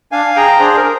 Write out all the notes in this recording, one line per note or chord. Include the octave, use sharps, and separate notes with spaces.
D4 F5 G#5
G#4 G5 A#5
D4 G#4 C5
A#4
G#4